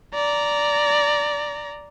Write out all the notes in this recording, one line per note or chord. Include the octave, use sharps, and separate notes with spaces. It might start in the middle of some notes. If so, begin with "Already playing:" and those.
D5 A#5